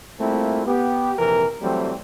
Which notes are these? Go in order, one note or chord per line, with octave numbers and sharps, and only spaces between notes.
G3 A3 A#3 C4 E4 F4
B3 G4
A#1 F2 C3 E3 A#4
E3 F#3 G3 A3 C4